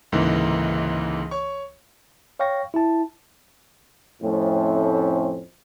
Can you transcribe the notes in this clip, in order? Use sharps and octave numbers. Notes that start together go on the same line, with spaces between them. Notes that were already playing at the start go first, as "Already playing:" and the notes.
C#2 G#2 D3 E3 A#3
C#5 C#6
C#5 F5 G5 C#6 A#6
E4 A5
F2 A2 A3 C4 C#4